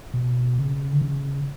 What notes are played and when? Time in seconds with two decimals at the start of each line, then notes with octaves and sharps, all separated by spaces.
0.14 B2
0.58 C#3
0.93 D3
1.01 C#3